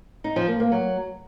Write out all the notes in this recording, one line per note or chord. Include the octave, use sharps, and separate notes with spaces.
D#4
F3
A#3
A#3
F#3